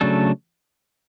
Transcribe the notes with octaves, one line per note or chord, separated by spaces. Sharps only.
C#3 F#3 A3 D4 A4